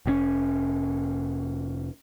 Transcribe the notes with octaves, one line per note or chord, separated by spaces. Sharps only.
F1 A2 C#4